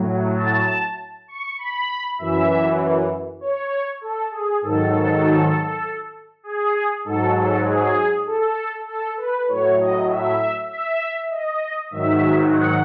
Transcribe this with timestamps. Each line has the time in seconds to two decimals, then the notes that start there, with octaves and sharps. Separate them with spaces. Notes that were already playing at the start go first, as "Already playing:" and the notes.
Already playing: A2 F#3
0.37 A5
1.28 C#6
1.58 B5
2.19 F#2 E3 E5
3.41 C#5
4.01 A4
4.31 G#4
4.62 G#2 D#3 F#3 A4
6.43 G#4
7.05 G#2 F#3 A4
7.35 A4
7.66 G#4
8.26 A4
8.87 A4
9.17 B4
9.48 A2 F#3 C#5
9.79 D#5
10.09 E5
10.69 E5
11.30 D#5
11.91 G#2 D#3 F#3 E5
12.51 F#5